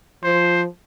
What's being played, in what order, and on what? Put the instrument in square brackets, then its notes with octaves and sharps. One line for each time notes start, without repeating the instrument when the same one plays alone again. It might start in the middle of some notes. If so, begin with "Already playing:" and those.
[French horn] F3 [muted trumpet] C5